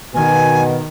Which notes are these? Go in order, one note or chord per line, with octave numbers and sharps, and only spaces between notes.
B2 D#3 G#5